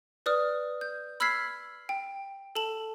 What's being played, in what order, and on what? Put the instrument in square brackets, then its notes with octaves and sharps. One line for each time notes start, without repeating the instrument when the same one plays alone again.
[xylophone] B4 D5 D#6 F6
G6
B5 E6 F6 G#6 B6 C7
G5
A4 A5 F#7